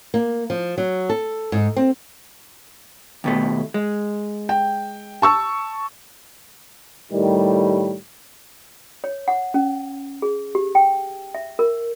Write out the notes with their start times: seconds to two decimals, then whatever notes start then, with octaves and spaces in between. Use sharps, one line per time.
0.14 A#3
0.50 F3
0.78 F#3
1.10 A4
1.52 G#2
1.76 C4
3.24 D#2 B2 A3
3.74 G#3
4.49 G5
5.22 A5 C#6 E6
7.12 A2 D#3 G3
9.04 C#5
9.28 F#5
9.54 C#4
10.22 G#4
10.55 G4
10.75 G5
11.35 E5
11.59 A#4